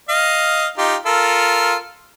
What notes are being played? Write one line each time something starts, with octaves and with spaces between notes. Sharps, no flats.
D#5 F5
D#4 F4 G4
F4 A4 A#4